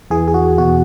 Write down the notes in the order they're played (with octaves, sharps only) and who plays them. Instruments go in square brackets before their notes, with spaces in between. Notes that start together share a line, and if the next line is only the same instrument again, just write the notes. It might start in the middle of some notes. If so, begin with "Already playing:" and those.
[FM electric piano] E2 E3 G#4
G#4
F#4
E2 B2 F#4